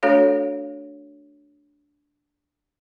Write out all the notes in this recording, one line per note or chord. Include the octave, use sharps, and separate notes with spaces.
A3 D4 F#4 A4 C#5 F5